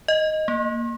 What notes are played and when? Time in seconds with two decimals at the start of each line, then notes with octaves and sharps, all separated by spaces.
0.08 D#5
0.48 A#3